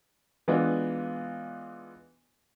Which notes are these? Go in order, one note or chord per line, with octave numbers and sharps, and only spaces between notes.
E3 G#3 B3 D4 F4